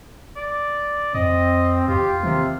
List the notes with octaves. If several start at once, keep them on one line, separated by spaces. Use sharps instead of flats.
D5
F2 C4 D#5
E2 F4 G4
C3 D#3